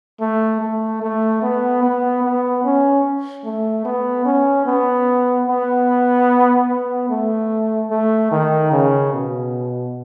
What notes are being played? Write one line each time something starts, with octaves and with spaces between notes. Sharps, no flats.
A3
A3
A3
B3
B3
B3
C#4
A3
B3
C#4
B3
B3
B3
A3
A3
D#3
C#3
B2